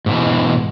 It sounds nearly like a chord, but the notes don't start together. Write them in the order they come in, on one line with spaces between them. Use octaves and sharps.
G#2 B2 E3